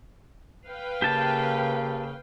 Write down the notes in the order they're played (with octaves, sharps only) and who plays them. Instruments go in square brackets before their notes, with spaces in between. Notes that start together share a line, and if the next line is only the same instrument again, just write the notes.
[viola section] B4 F5 G5
[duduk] C#3 [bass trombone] A#3 [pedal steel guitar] G4 A5